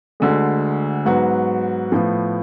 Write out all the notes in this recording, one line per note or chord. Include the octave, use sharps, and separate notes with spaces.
D2 D3 G#3
G#2 F#3 B3 F#4
A2 F3 B3